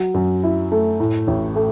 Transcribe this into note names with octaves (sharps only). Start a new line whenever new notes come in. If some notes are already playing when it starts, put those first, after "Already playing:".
Already playing: F#3
F#2
E4
A3
A2
A1
A3